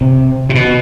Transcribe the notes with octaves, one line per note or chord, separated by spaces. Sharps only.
C3
C3
B2